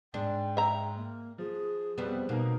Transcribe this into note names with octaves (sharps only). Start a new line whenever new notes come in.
G#2 D4 G5
E5 A#5
A#3
F3 G#4
F2 G3 B3
B2 A#3 B3 D#4 A#4